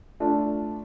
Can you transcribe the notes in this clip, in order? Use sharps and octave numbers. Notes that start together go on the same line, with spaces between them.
A3 D4 F4